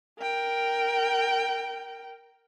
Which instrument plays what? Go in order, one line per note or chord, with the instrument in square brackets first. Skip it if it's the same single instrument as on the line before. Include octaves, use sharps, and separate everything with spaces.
[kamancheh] A#4 G5